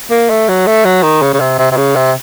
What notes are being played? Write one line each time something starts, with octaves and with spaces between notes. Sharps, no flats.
A#3
A3
F#3
A3
F#3
D#3
C#3
C#3
C3
C3
C3
C#3
C3